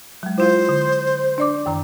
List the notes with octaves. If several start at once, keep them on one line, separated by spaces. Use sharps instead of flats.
F#3 G#3
E4 F4 C5 F5
D3
D4 D5 D6
F#2 D#3 A#5